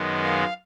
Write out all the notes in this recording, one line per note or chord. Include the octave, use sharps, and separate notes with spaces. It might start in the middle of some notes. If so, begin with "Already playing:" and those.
Already playing: F#2 D#3 G#3 B3
F5